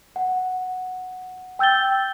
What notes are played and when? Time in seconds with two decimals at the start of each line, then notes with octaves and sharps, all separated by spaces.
0.16 F#5
1.59 G5 E6 G6 A6 G7